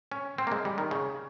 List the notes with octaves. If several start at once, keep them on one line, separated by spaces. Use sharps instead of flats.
C#4
C4
A#3
G#3
G3
D#3
C#3